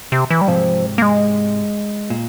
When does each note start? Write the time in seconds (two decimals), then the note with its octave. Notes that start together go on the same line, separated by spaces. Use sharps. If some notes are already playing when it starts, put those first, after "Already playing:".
0.12 C3
0.30 E3
0.41 G3
0.48 G#2 C3 F3
0.98 A#3
1.02 G#3
2.10 A#2